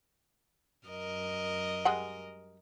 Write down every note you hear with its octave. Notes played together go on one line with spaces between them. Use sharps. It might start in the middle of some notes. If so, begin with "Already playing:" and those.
F#2 A#4 D#5
G3 G#3 F#5